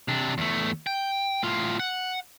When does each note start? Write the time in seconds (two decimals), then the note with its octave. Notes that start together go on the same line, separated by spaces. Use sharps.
0.08 C3 D4
0.38 E2 A3
0.87 G5
1.43 A2 F4
1.80 F#5